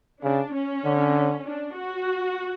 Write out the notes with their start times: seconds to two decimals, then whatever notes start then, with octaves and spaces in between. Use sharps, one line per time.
0.23 C#3 D4
0.54 C#4
0.85 D3
1.45 D4
1.76 F#4